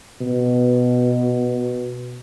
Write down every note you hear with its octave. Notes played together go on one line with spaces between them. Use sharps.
B2